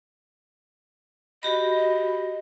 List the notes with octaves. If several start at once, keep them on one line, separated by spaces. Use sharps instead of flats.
F#4 G4 D#5 B5